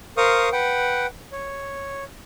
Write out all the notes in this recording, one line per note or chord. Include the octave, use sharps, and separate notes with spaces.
A#4 C5 F5 C#6 D#6
B4 F#5 G5
C#5